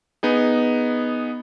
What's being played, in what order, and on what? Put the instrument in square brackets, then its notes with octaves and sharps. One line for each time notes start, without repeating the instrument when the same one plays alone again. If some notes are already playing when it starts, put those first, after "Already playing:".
[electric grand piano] B3 D#4 G#4